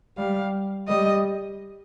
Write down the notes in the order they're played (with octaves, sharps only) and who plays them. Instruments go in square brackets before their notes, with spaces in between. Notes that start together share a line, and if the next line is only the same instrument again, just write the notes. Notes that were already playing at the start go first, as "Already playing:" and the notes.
[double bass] G3 [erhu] F5
[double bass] G3 [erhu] D#5